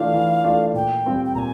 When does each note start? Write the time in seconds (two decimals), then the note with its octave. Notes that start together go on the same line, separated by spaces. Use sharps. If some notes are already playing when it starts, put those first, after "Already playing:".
Already playing: E3 A3 D4 F4 F5
0.14 E3
0.44 A3 D4 F4
0.74 A#2 G5
1.05 G3 C4 F4
1.25 G5
1.35 A#2 G#5 A#5